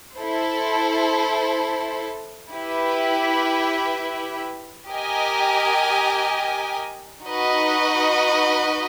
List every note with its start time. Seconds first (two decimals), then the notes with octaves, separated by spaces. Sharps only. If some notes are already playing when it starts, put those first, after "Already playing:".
0.15 E4 A4 C5
2.51 E4 G4 B4 E5
4.88 G4 A#4 D#5 G#5
7.23 D#4 F#4 B4 D#5